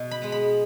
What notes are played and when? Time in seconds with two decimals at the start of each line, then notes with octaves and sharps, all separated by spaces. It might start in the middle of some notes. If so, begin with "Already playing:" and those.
Already playing: B2
0.11 B5
0.22 G#3 B3
0.32 B5